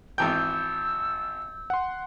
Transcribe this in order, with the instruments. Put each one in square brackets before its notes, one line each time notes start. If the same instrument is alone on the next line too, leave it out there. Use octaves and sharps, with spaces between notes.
[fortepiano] G#1 E3 G5 [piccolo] E6 [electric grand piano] G6
[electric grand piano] F#5 C6